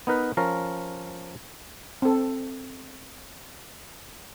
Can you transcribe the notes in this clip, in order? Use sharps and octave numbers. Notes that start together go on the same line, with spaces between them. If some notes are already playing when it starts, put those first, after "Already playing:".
B3 D#4 A#4 B4
F3 C#4 A#4
C4 A4